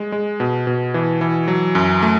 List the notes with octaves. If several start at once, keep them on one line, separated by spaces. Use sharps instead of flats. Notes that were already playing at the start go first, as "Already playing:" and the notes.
Already playing: G#3
G#3
B2
B2
E3
E3
F#3
F#2
A3